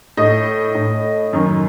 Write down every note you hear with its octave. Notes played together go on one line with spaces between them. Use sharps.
A2 D#5
A2
F#2 D#3